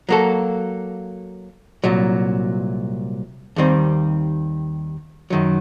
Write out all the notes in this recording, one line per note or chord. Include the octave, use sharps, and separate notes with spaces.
F#3 A#3 F#4 A4
C2 A#2 F#3
D#2 D#3 G3 C4
F#2 D#3 F#3